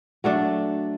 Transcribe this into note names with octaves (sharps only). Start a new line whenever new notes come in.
F#3 A3 D4